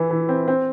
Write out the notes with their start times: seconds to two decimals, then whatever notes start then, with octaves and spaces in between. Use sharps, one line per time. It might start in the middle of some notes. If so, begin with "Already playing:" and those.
Already playing: E3 E4
0.11 E3
0.29 C4
0.48 C4